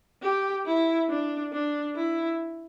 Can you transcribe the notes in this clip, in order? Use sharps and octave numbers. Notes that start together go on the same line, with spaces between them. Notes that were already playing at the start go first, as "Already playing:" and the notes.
G4
E4
D4
D4
E4